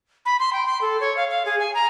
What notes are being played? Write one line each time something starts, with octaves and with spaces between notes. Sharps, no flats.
B5
C6
G5
C6
A4
C#5
F5
F5
G#4
G#5
A#5